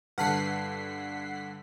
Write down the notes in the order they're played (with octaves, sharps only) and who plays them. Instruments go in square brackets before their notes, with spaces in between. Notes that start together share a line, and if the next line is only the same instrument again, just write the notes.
[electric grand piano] G2 D3 [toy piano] B4 A5 [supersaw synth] F#5 B6 C7